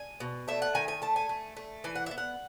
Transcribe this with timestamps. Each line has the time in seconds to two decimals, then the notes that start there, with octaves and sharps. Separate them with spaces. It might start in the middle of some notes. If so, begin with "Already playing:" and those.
Already playing: G#5
0.20 B2
0.48 A3 E5
0.62 F#5
0.75 D#3 G#5
0.88 G#5
1.02 A3 A5
1.16 G#5
1.29 A3
1.57 A3
1.84 E3 G#5
1.96 F#5
2.06 B3 E5
2.18 F#5